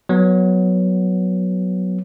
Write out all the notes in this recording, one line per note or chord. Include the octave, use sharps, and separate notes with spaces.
F#3 B3